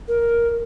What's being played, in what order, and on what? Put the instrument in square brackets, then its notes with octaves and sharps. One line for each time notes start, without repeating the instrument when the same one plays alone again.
[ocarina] A#4